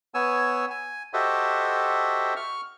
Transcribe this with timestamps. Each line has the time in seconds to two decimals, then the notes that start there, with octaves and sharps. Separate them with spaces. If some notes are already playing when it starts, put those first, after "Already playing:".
0.14 B3 C#5 G#5 E6
0.70 G#5
1.13 F#4 G4 A4 C5 D#5 E5
2.36 C#6 F6